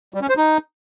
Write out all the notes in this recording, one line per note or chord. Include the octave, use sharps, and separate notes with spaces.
G3
C#4
C5
D#4